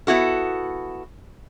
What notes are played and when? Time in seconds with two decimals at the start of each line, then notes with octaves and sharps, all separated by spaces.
0.07 B3 E4 F#4 A4